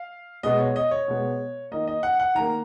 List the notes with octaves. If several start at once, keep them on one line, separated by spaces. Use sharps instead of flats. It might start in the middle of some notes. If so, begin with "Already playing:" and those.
Already playing: F5
B2 G#3 B3 D#5
C#5
D#5
C#5
B2 G#3 B3
D#3 A#3 D#5
D#5
F#5
F#5
D#3 A#3 A#5